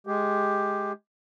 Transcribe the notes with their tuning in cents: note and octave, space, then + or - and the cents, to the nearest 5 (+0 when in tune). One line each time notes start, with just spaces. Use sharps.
G#3 +10 G4 +5